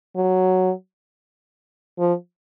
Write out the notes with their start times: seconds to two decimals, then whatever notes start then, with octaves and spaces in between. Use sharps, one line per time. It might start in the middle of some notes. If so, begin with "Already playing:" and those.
0.16 F#3
1.99 F3